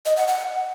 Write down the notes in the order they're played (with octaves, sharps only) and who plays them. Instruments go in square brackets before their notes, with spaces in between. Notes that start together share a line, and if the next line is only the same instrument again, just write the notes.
[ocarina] D#5
F#5
F#5